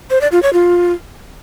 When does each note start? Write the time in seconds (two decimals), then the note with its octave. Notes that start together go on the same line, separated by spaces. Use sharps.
0.10 C5
0.21 D5
0.32 F4
0.43 C#5
0.53 F4